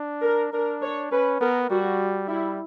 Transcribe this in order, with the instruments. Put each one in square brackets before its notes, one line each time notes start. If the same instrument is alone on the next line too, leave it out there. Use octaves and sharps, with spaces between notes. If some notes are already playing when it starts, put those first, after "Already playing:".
Already playing: [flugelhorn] D4
[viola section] A#4
[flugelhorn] D4 [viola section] A#4
[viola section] C#5
[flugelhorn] C#4 [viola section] B4
[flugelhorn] B3 [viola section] A#4
[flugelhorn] G3 [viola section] F#4
[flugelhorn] G3 [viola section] E4